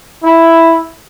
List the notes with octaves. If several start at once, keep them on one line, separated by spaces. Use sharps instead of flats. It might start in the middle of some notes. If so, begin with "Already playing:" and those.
E4